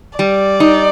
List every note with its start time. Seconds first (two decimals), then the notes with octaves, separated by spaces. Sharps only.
0.19 G3 D5
0.60 D#4